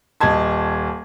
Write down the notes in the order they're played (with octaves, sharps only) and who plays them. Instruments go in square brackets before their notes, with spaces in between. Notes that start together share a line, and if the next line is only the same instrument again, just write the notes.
[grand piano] D#1 D#5 A5 G#6